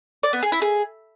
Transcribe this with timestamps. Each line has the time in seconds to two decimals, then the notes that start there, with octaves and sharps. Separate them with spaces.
0.23 D5
0.33 B3
0.43 G#4
0.52 E4
0.62 G#4